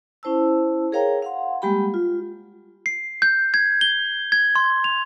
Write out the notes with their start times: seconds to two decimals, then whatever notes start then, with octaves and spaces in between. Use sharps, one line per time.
0.23 C#4 E4 C5 A5 E6
0.92 G#4 A#4 C#5 F5 G5 A#5
1.22 F5 F#5 C6
1.62 G3 G#3 A#3 G4 G5 B5
1.94 F4
2.86 C7
3.22 G6
3.54 G#6
3.81 G7
4.32 G#6
4.56 C6
4.84 F7